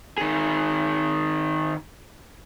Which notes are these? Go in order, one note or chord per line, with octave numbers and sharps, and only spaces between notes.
D#3 G#4